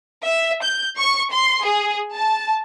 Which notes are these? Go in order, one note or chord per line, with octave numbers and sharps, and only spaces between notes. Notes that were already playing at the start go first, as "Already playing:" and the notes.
E5
G6
C#6
C6
G#4
A5